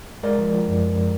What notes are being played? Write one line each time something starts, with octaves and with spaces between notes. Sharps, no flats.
G#3 A#4 D5
F3
F3
F#2
F#2